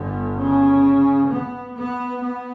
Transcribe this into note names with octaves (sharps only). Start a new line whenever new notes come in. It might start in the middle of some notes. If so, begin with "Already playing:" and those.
Already playing: G1 G2 D3
C#3
B3
B3
B3